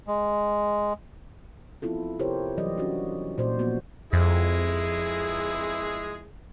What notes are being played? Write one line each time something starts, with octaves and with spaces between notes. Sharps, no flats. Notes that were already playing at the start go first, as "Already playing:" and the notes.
G#3
F3 B3 C4 E4 F4 A4
C3 E4 G4 A#4 C5 C#5
E3 F#3 G3 G4 D5 D#5
C#4 D4 F#4
A#2 A#3 F#4 C5 D5
F3 A#3 B3 F#4
F2 G#3 E4 G#4